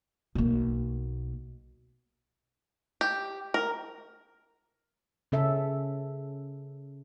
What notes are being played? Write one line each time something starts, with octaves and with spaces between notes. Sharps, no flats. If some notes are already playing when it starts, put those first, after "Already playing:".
B1 A#3
G4
A#4
C#3 C#4 A4 E5